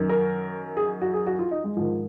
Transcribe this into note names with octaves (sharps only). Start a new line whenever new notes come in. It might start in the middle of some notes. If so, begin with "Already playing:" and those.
Already playing: F#2 D#3
A#4
G#4
F#4
G#4
F#4
F4
D#4
G#3
G#2 D#3 F3